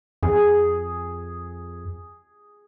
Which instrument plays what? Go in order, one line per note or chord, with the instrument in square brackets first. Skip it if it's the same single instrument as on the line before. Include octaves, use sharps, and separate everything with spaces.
[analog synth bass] F2 [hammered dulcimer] G#4